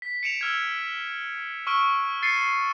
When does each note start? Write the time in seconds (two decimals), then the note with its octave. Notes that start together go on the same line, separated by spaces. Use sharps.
0.02 B6
0.23 C#7 D7 E7 F7
0.41 E6 F6 G#6
1.67 C#6 E6 F6 D7
2.22 A6 C7 C#7 D#7